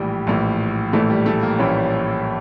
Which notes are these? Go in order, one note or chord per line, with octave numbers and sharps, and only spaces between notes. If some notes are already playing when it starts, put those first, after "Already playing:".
Already playing: A#1 A2 E3 G3
A#1 A2 E3
A#1 A2 E3 A3
G3
A3
A#3
A#1 A2 E3 C#4